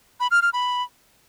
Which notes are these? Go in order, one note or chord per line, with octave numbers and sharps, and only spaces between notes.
B5
F6
F6
B5